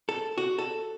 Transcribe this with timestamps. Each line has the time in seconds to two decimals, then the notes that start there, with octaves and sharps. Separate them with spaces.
0.09 A4
0.38 F#4
0.58 A4